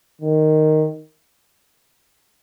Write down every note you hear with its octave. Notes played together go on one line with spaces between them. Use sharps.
D#3